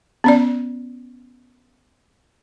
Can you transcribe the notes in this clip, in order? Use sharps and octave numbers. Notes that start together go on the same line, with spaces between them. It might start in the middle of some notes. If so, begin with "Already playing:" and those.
B3 C#4 D5